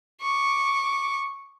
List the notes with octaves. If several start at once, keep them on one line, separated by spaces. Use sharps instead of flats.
C#6 D6